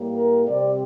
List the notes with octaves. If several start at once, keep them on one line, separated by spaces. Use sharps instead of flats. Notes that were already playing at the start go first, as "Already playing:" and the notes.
Already playing: A2 G3 A#3
A#4
C3 G3 C4 D5